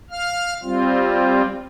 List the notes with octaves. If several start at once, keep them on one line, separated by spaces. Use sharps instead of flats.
F5 F6
G3 C4 F4